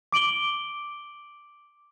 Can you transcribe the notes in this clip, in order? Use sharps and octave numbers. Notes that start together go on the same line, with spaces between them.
D6 D7 F#7 G7